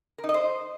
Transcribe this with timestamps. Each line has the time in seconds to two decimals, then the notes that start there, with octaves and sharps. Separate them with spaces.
0.18 A#4
0.24 D#4
0.29 D#5
0.34 C5